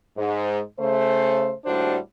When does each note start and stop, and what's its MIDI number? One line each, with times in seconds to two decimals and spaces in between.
0.17 0.60 44
0.79 1.54 49
0.79 1.54 57
0.79 1.54 72
1.65 1.97 39
1.65 1.97 45
1.65 1.97 55
1.65 1.97 62
1.65 1.97 66
1.65 1.97 72